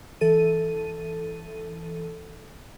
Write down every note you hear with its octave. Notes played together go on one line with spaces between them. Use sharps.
E3 A4 D#7